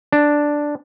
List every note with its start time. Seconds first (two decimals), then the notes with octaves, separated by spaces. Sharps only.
0.13 D4